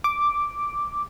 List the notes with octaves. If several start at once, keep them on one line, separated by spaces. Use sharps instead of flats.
D6